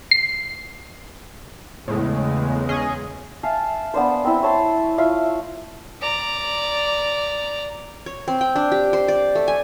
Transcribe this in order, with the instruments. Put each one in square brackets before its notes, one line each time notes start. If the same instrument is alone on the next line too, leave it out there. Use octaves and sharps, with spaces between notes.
[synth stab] C7
[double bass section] E2 C#3 G#3 [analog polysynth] A2
[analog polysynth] C#4 G#4 D#5
[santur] E5 F5 G#5 A5
B3 D4 C5
C4 E4
C#5 A5 C6
F4 E5 F5
[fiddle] D5 A#5
[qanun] C#5
C4
G5
D4
G4
C5
D5
A3
G#5